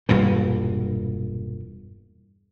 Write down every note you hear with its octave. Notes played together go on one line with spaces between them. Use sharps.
E1 G2 A#2 E3